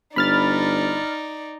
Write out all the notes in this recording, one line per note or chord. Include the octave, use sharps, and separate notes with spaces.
G1 D#4 D5 B5 F6 A6